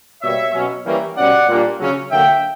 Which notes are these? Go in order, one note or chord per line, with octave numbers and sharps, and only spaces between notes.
B2 G3 A#3 C#5 E5
B2 F#3 C#4
E3 G3 A#3 C#4
B2 G3 C#4 D5 F#5
A#2 G3 A#3 D4
C#3 F#3 C#4
D3 F#3 A#3 E5 G5